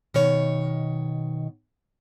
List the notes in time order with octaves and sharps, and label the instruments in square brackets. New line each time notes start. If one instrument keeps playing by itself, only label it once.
[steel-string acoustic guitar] B2 D#3 C#5